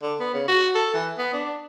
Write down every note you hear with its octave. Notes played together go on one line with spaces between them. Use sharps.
D3
B3
C#3
F#4
A4
E3
B3
D4